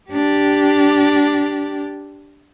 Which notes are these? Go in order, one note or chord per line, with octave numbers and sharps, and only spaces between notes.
D4 G4